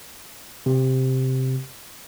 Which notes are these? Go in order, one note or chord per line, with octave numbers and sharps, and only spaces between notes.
C3